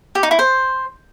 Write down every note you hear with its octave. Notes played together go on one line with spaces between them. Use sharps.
G4
D#4
E4
C5